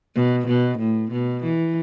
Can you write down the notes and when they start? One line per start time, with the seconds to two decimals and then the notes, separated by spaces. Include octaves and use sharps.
0.15 B2
0.47 B2
0.79 A2
1.11 B2
1.43 E3